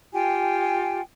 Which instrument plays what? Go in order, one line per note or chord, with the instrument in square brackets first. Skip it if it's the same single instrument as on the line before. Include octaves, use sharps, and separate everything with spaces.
[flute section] F4 G4 G5 G#5